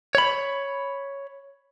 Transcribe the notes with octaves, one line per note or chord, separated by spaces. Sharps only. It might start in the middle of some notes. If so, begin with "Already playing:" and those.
C#5 B5